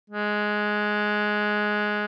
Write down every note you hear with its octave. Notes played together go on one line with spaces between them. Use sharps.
G#3